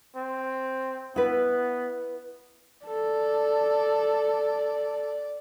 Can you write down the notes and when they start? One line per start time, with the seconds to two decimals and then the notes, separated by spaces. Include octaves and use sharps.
0.16 C4
1.16 B3 E4 B4
2.87 A4 D5